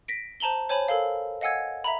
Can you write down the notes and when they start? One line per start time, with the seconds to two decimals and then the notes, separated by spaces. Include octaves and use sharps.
0.08 A#6 B6 D7
0.40 C5 A5 A#5 F#7 G7
0.69 C5 C#5 G#5 A5 B5
0.88 A4 A#4 F5
1.41 D#5 F5 F#5 G#5 E6 G#6
1.84 E5 A#5 B5